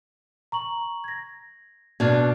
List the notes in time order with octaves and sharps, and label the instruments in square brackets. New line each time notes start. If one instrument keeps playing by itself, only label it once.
[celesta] A#5 C#6 F#7
G#6 A#6
[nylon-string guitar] B2 D4 [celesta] F6 F#6 G#6